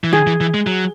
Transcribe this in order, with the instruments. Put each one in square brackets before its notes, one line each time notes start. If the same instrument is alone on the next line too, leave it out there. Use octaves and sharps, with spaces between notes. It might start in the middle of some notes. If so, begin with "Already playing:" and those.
[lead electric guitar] E3
[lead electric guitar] D#3 [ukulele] G#4
[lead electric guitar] E3
E3
G#3
F#3